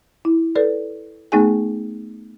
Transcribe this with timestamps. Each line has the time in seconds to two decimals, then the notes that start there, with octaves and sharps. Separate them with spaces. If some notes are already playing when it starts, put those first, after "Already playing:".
0.25 E4
0.56 A4 B4 D5
1.32 A3 B3 D#4 G#4 G#5